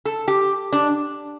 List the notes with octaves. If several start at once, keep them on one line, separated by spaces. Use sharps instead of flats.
A4
G4
D4